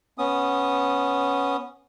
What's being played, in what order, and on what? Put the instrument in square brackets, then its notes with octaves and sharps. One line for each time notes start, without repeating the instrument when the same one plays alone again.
[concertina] B3 C#4 D#6